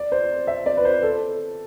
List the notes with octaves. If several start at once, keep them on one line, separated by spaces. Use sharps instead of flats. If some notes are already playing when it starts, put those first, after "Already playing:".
Already playing: D5
C5
E5
D5
B4
C5
A4